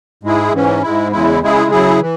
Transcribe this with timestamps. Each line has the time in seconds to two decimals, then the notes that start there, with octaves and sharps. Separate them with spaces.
0.23 G#2 G#3 E4 G#4
0.53 G#2 E3 C#4
0.83 G#2 G#3 E4
1.12 E2 C#3 G#3 E4
1.42 C#3 G#3 E4 G#4
1.71 C#3 F#3 E4 G#4
2.01 E3